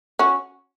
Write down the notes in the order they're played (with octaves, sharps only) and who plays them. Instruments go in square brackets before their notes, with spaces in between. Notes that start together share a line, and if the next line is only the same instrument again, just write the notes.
[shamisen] C#4 F#4